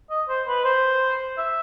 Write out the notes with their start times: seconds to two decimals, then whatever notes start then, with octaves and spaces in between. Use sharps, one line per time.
0.10 D#5
0.28 C5
0.47 B4
0.64 C5
1.38 E5